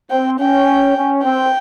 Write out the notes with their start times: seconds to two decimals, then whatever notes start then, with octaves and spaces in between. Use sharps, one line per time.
0.10 C4 G5
0.40 C#4 G5
0.97 C#4
1.24 C4 G5